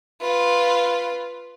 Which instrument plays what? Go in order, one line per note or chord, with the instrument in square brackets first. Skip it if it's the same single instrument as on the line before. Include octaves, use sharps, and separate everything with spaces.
[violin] F4 B4